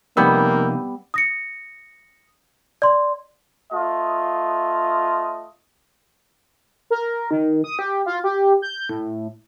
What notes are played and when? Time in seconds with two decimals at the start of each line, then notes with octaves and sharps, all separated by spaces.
0.17 C3 F3 G3 A#3 B3 D#4 E6 G6
1.14 D#6 A#6 C#7
2.82 D5 C6
3.72 A3 F4 D#5
6.90 A#4
7.31 D#3
7.64 D#6
7.79 G4
8.06 F4
8.24 G4
8.62 G6
8.89 A2